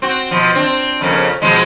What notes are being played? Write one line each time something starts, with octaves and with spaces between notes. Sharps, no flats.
C4 F#4
B2 F3
C4 D4
F2 C#3 A#3
B2 F3 G#3